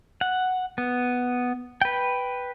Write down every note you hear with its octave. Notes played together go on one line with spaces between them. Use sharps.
F#5
B3
B4 G5